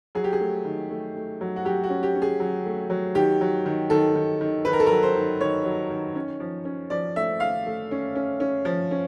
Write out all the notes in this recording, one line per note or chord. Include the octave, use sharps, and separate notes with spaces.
F#3 G#4
G4
G#4
A3
D#3
A3
A3
F#3
F#4
F#3 G4
F#4
C#4
G4
C#4
G#4
F#3
A3
F#3
D#3 G4
F#3
D#3
D#3 A4
D#3
D#3
D#3 B4
A#4
A4
A#4
F#3
C5
D#3
D#3 C#5
F#3
D#3
C#4
F3
C#4
F3 D5
A3 E5
A3 F5
A3
C#4
C#4
C#4
F3
C#4